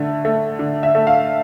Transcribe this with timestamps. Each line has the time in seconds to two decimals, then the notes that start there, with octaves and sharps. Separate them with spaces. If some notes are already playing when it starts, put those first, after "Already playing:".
Already playing: D3 A3
0.25 A3
0.59 D3
0.83 E5
0.95 A3
1.07 F5